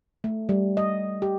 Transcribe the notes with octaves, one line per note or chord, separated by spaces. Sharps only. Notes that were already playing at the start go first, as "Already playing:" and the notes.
A3
G3
D#5
G4